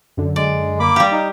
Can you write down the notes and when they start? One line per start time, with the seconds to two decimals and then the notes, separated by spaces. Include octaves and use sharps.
0.17 F#2 D3
0.36 G#3 D5
0.80 A#3 B5 D6
0.96 G3 G4 F5
1.12 D#4